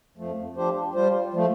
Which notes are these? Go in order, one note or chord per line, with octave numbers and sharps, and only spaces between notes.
F2 F3 A3
F3 D4 G4 C5
G3 F4 C5
F3 A3